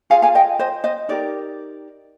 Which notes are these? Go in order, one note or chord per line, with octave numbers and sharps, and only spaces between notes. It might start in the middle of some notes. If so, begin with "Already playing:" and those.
F4 G#4 F5 G#5
F5 G#5
D#5 G5
C5 D#5
C5 D#5
D#4 G4 A#4 D5